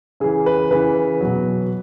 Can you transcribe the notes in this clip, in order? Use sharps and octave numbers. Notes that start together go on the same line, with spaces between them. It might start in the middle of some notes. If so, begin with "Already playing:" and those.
C#3 E3 G#4
B4
C#3 E3 B4
B2 F#3